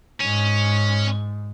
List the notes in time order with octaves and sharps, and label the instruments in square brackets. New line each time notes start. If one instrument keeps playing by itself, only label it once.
[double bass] G#2 [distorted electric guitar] C#4